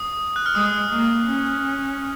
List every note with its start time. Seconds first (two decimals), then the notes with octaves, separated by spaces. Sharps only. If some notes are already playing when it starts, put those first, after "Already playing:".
Already playing: D#6
0.36 F#6
0.46 F6
0.55 G#3 D#6
0.91 A#3
1.26 C#4